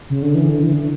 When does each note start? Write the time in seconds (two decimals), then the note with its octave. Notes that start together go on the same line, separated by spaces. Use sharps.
0.10 C#3
0.22 D3
0.35 E3
0.49 D3
0.63 E3
0.73 D3